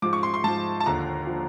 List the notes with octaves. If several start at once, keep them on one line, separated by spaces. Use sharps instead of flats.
G#2 F3 D6
C#6
C6
C6
G#2 F3 A5
A5
D#2 D3 F3 A#5
D3 F3